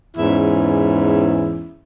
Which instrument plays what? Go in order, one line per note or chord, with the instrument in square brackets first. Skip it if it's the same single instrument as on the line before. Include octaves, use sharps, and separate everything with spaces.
[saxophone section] E2 G#2 C#4 E4